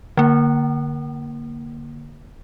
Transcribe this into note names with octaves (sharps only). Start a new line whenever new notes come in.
D3 A#3